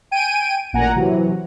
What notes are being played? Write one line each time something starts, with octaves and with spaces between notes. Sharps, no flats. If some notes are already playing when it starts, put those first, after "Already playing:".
G5 G#5 D7 D#7
A1 A#2 F#5 G#5 A#5
C3 E3 F#3